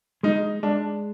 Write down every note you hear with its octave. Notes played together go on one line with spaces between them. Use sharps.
G#3 D#4
G#3 D4